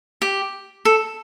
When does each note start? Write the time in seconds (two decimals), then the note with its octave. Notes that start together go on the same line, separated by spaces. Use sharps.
0.22 G4
0.85 A4